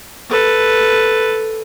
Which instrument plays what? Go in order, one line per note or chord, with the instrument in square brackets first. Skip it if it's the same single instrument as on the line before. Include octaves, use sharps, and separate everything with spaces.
[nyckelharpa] A4 B4